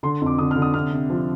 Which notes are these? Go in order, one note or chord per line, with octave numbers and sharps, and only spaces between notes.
D3 C6
F2 D6
D3 D#6
F6
D3
D#6
C3 F6
C3
F3